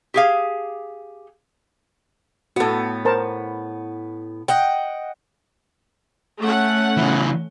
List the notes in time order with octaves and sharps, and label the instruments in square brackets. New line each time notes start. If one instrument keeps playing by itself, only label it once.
[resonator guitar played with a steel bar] G4 G#4 F5
[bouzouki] A2 B3 [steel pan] F#4 A4
[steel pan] A#4 C5 A5
[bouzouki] D#5 F#5 G5
[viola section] A3 C#4 F#5
[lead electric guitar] C#3 E3